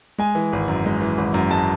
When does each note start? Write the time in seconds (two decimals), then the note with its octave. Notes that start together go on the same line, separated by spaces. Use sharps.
0.18 G#3 G#5
0.35 E3
0.53 G#1
0.68 F#2
0.86 G#3
1.01 E3
1.18 G#1
1.34 F#2
1.51 G#3 A5